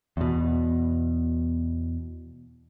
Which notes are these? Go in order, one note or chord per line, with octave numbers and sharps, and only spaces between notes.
E2 B2